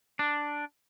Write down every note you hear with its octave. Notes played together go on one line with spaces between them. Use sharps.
D4